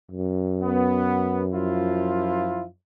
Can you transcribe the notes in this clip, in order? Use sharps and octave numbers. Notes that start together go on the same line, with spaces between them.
F#2
B3
F3 E4 F4